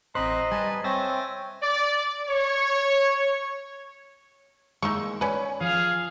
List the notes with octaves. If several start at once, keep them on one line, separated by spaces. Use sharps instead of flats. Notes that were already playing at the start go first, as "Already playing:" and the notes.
A1 C4 C5 D#5 A#5 B5 F#6
G3 B4 G#5 A5
C4 C#5 E5 G5 G#5 A6 A#6
D5
C#5
G#3 A#3 D#4 E5 C#6
C#4 B4 D5
F3 G#4 F5